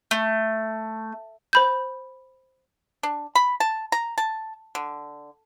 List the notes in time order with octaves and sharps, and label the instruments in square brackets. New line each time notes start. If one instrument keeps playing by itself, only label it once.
[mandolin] A3
[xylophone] C5 B5 G6
[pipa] D4
B5
A5
A#5
A5
D3